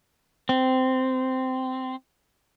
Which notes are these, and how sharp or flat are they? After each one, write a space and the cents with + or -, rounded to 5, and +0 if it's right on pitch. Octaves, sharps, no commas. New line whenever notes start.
C4 -15